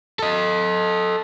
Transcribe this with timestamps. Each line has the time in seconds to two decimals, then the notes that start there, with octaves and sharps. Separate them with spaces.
0.19 A4 D#5